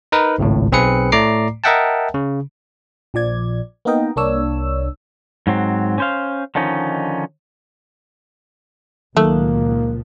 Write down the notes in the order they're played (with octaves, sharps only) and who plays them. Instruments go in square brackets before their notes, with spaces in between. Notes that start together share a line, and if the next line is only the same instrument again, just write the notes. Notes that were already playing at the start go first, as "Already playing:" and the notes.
[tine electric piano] D#4 A#4 B4
G#1 C#2 A2
B1 C4 G#4 B4 C#7
A2 A3 D5 A#5 D6 C7
A#4 D#5 E5 F#5 G5 A5
C#3
[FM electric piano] A#1 F3 D5 G#6
A#3 B3 D#4 A#4 D#5 G5
C2 A#3 D4 C#5 E6
[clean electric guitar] G#2 F#3 C4
C#4 C5 F5
D3 D#3 F3 C#4 D#4
[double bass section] C#2 A#2 F3 [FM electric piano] D#3 F#3 [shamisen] A3 [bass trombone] A#3